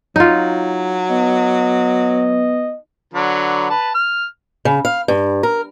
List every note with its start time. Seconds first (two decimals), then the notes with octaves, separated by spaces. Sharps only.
0.16 F#3 D#4 F4
1.10 B3 D#5
3.14 D3 F#3 B4
3.70 B4 A5
3.95 F6
4.65 C#3
4.85 F5
5.08 G2
5.43 A#4